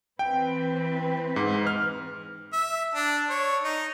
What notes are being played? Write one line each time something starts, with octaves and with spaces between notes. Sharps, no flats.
E3 C4 B4 G5
G#2
F6
E5
D4
C#5
D#4